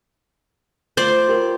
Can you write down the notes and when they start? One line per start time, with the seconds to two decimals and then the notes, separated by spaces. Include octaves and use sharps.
0.97 A3 F4 C5 D5 C6 G6
1.29 F4 G4 A#4